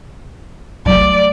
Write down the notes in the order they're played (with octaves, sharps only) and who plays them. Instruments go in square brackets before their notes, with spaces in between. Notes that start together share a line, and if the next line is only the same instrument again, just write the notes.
[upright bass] F#3 A3 [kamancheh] D5